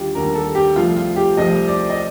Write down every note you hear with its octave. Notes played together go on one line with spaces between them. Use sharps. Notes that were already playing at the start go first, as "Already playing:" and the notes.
Already playing: D#2 D3 G3 F4 G4
D#2 D3 G3 A#4
A4
G4
C2 C3 F3 A3 F4
F4
G4
C2 C3 F3 A3 D#5
D5
D#5